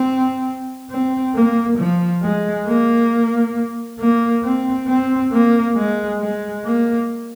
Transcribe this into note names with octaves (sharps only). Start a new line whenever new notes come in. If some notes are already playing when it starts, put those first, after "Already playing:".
Already playing: C4
C4
A#3
F3
G#3
A#3
A#3
C4
C4
A#3
G#3
G#3
A#3